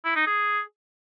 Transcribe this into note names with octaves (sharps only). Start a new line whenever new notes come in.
E4
D#4
G#4